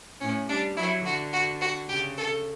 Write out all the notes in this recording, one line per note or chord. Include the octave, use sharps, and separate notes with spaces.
A2 C#4
G3 D4
F#3 E4
D3 F#4
F#4
F#4
C#3 G4
A4